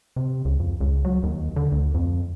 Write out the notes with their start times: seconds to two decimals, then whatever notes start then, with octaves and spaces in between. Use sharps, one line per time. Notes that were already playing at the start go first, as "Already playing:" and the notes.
0.16 C3
0.45 C#2
0.60 F2
0.81 C#2
1.05 F#3
1.23 D#2
1.56 D3
1.72 D2
1.94 F2